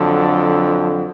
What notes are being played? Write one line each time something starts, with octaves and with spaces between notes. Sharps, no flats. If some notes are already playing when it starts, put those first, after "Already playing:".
Already playing: F2 D3 F#3 A4